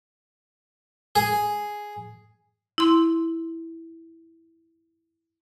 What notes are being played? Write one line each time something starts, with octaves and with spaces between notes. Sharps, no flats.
G#4
E4 C6